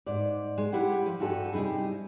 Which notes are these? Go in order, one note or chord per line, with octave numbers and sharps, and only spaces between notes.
G#2 D5
G#3
E4 G4 F#5
F3
G2 F#4 G4 A4 G#5
C3 G3 D#4 E4 G#4